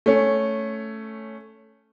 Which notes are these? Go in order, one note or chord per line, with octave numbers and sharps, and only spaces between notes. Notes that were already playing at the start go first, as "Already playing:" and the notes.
A3 C#4